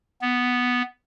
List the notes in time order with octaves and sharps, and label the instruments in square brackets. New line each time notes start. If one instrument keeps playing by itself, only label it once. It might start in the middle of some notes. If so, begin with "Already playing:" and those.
[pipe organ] B3